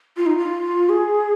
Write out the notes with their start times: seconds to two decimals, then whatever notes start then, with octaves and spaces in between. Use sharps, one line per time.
0.17 F4
0.26 D#4
0.37 F4
0.89 G#4